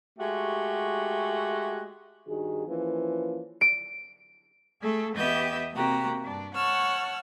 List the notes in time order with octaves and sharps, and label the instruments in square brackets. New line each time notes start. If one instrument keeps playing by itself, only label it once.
[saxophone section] G#3 A3 F#4 G4
[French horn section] G2 D#3 F#4 G#4
E3 F3 A#3 C#4 B4
[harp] D7
[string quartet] A3 G#4 A4
E2 B3 G4 D#5 E5 G6
C3 A#3 F#4 G4 A#5
G2 D4
C#5 F#5 A5 C#6 E6 F6